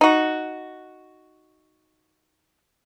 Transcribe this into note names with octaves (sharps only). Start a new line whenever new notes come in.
D#4 F#4